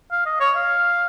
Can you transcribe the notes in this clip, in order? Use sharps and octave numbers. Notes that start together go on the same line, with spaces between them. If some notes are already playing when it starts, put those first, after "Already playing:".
F5
D#5
C#5
F5